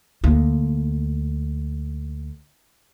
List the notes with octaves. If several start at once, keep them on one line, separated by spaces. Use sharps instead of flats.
D2 A#3